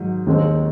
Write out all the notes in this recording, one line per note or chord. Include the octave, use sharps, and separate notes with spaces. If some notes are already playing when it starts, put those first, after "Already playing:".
Already playing: G#2 D#3 F#3
D#2 D#3 G#3 C4